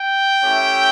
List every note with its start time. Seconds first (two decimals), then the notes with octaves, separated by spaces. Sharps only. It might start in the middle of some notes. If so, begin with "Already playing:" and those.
Already playing: G5
0.43 A3 C#4 E4 G4